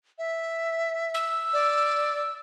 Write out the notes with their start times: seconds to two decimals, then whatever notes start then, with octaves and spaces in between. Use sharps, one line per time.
0.18 E5
1.14 E6
1.53 D5